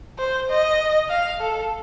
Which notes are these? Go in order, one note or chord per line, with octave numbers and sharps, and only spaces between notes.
C5
D#5
F5
A4